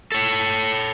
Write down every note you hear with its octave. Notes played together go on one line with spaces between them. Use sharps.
A4 C#5